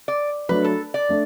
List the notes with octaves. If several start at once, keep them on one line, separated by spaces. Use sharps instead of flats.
D5
F#3 A3 D4 B4
A4
D5
A3 D4